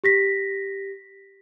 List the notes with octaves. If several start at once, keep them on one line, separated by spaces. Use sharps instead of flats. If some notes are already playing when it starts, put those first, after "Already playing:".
G4 A#6 B6